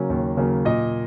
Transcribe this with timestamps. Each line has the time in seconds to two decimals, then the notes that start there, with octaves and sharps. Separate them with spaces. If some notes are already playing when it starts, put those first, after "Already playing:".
Already playing: C#3 F#3 A#3 C#4
0.10 D#2
0.37 C#3 F#3 A#3 C#4
0.65 A#2 D#5